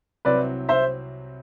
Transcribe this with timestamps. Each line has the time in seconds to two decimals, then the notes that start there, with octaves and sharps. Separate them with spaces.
0.25 C2 C3 F#3 C4 E4 B4 D5
0.69 C5 E5